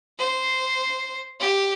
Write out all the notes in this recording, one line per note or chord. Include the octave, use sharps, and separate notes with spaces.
C5
G4